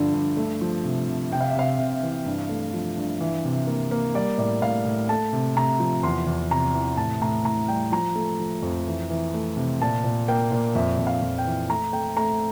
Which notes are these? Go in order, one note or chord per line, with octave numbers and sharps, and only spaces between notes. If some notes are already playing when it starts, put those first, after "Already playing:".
Already playing: G2 D3 F3
G2
A3
F3
C3
C3
C3 G5
F5
E5
C3 F5
C3
E3
G2
A3
F3
G2
E3
C3
A#3
A#3
G3 D5
A2 D5
A2 F5
A2
A3 A5
C3
C3 A#5
F3
E2 C6
E2
C3 A#5
E3
A2 A5
A2 A#5
A2 A#5
G3 G5
F3 A#5
A3
F3
F2
E3
E3
A3
C3
A#2 A5
A#2
A#3 G5
A#2
F2 E5
F2
F5
F2
G5
E3
A3 A#5
A3 G5
A3 A#5